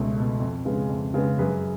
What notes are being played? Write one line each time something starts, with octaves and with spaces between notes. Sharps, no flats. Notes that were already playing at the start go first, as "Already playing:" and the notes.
Already playing: C#2 B2 A3
B2 A3
F2
C#3 G#3 B3
F2
C#3 G#3 B3
F#2 G#4 B4